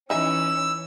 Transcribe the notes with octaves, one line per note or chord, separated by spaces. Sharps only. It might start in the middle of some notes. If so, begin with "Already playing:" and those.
E3 C#4 D#4 E5 G#5 E6